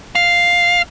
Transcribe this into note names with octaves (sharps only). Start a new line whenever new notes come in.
F5